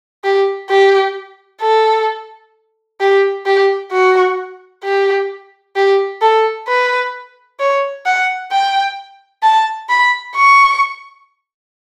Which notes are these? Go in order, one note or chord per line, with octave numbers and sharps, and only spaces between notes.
G4
G4
A4
G4
G4
F#4
G4
G4
A4
B4
C#5
F#5
G5
A5
B5
C#6